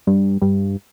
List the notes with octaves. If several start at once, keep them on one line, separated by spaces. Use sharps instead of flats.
G2
G2